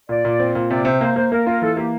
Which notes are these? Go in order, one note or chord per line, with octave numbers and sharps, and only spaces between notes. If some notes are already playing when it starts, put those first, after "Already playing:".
A#2 D5
A#2
C4
A#2
C3 D5
C3 C5
A#3 C5
A#3 C5
A#3 A#4
F4 A#4
E3 A4
A#3 G4